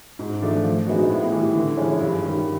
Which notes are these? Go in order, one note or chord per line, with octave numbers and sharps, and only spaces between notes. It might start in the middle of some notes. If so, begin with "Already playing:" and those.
G#2
F3 A3 D4
F3
G#3 B3 D#4 F#4
A2
E3 G3
D3
F3 G#3 C#4 E4
G2
D#3 G3